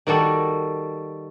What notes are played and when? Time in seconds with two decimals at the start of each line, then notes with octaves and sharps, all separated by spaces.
0.07 D#3 G3 F#4 A4